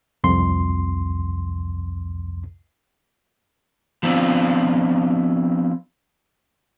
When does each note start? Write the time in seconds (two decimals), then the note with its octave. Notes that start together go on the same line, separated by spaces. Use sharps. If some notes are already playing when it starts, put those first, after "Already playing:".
0.24 C2 F2 C6
4.03 F3 B3 C4 D4 F4